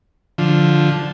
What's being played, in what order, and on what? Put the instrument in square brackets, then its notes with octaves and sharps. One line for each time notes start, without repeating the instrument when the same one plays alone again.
[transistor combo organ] D3 F3